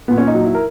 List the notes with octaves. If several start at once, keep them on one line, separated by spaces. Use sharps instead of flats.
A#2 B3
C#4
D#4
F#3
E4
A#4